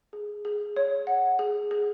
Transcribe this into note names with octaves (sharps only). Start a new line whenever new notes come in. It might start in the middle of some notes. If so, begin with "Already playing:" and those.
G#4
G#4
C#5
F#5
G#4
G#4